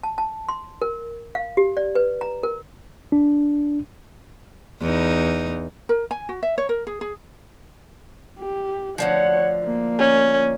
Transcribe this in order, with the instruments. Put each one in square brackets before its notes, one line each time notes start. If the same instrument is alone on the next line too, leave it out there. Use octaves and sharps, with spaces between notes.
[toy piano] A5
A5
C6
A#4
F5
G4
D5
B4
A#5
A#4
[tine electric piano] D4
[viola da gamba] E2 D#4
[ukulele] A#4
G#5
F#4
E5
C#5
A#4
G#4
G#4
[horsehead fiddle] G4
[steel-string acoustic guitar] D2 D3 F3 [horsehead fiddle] C#5 F#5
[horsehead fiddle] A#3
[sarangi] C#4